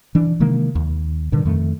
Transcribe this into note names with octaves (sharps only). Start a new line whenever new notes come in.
E3 D4
C3 D#3 G#3 A#3
D#2
G2 A#2 D3 D#3
F2 D#3 A3